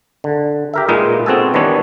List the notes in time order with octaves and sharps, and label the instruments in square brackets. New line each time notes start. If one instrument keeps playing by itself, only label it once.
[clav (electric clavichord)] D3
G4 A#4 E5
A#2 G#3 D#4 F4 B4 D#5
B3 C4 F#4 G#4 A4
D#3 E3 G3 B3 D4 C#5